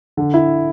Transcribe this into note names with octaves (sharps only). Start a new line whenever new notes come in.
D3
E4